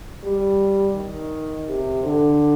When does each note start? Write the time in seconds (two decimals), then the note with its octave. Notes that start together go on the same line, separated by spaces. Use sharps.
0.23 G3
0.95 D#3
1.67 C3
2.04 D3